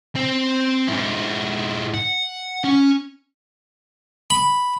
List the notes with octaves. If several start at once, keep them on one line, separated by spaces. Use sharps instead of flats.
C4
G#2 E4
F#5
C#4
B5